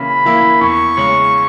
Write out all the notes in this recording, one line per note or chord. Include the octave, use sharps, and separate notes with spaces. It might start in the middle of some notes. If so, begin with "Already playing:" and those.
Already playing: C#3 E3 A#3 E4 B5
E3 A#3 E4
E2 C#6
C#3 G#3 C#4